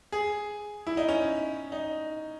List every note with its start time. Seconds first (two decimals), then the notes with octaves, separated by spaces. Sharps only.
0.12 G#4
0.87 E4
0.97 D#4
1.09 C#4
1.72 D#4